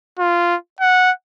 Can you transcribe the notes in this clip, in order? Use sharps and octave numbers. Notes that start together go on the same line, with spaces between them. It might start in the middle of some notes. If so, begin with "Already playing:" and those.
F4
F#5